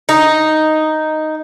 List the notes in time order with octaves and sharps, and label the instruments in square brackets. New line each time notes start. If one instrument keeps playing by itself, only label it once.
[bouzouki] D#4